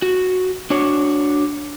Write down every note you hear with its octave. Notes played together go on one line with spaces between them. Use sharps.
F#4
D4 F#4 C#5